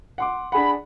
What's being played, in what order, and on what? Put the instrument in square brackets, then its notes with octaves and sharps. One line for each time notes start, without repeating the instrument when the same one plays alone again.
[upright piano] F#5 C6 D6
[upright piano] D4 G#4 F#5 [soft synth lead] B5